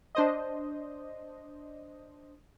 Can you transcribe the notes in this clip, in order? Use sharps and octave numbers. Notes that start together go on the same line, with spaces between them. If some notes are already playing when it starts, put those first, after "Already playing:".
D4 C5 D#5